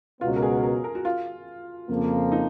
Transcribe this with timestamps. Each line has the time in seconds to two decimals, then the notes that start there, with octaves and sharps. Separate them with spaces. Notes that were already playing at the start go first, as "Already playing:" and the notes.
0.21 C#2 B2 F#3 B3 F4
0.36 A#4
0.42 G#4
0.63 A#4
0.84 A#4
0.95 F#4
1.05 F4
1.89 F2 C#3 F3 A#3
2.32 D#4